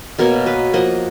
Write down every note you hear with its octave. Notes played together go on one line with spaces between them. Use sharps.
B2 A#3 A#4 C#5
B4 D#5
F3 A#3 D#5 F#5